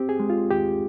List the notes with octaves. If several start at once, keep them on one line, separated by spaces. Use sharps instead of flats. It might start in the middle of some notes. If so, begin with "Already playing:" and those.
Already playing: C4 G4
G#4
G#3
F4
D#2 G4